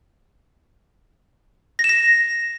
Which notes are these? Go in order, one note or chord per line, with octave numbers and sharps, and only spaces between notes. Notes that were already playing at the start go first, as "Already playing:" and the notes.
A#6
E7
A#6